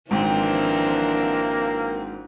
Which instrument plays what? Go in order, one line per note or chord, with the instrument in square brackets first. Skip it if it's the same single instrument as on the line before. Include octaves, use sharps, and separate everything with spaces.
[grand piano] G#1 G#2 [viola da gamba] E3 F3 D4 [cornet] A#3 [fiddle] C4